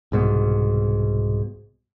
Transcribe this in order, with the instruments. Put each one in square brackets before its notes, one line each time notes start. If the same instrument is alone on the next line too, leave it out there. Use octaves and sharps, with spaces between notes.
[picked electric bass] C2 G#2 B2